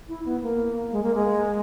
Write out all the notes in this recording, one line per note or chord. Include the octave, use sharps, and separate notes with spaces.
E4
B3
A#3
G#3
A#3
G#3